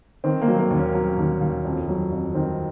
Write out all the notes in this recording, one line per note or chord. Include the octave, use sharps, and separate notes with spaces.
D#3 C4
A#3
F#3
A#3
D#2
C#4
F#3
D#2
D#2
F2
F#3
F2
D#3 C4